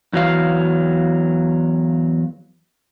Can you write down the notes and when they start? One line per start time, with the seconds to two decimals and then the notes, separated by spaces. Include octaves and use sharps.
0.13 E2 F#3 F5